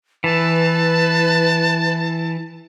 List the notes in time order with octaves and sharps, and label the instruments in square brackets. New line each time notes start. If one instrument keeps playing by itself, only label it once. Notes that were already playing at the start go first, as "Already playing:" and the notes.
[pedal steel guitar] E3 [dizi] B4 [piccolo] A5